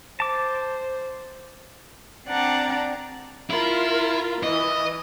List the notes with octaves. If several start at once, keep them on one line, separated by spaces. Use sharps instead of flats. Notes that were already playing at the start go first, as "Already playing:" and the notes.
C5 A5 D6
C4 D4 D5 F#5 A5 A#5
E4 F4 A#4
E3 D#5